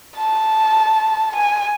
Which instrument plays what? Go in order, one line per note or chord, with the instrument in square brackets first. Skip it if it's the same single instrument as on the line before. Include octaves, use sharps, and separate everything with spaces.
[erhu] A5
G#5